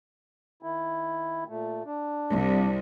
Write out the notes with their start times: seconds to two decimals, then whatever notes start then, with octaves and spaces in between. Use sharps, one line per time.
0.63 D#3 E4
1.48 A#2 A3
1.86 D4
2.32 C2